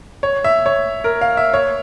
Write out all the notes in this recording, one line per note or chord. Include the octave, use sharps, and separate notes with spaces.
C#5
E5
C#5
A#4
F5
E5
C#5